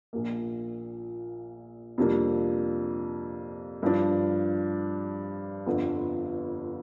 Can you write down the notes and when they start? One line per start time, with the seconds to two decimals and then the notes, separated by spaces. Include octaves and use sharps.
0.13 A#1 A#2 A#3
1.98 F2 C3 G3 A#3 D4
3.83 G2 F3 D4
5.66 G1 F2 D3